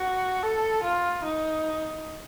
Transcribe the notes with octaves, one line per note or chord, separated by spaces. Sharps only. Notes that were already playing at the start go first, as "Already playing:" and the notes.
Already playing: F#4
A4
F4
D#4